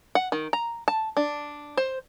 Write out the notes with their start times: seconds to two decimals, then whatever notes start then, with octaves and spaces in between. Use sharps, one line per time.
0.15 F#5
0.32 D#3
0.53 A#5
0.88 A5
1.17 D4
1.77 C5